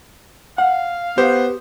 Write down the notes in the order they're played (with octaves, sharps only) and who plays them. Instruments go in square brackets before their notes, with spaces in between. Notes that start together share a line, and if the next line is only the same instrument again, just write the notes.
[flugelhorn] F5 [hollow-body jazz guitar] F#5
[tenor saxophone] B3 [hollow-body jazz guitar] G4 [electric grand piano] C5